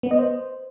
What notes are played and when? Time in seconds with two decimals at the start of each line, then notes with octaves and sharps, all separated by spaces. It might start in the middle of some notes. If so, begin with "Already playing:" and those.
0.03 B3
0.11 D#5
0.19 C5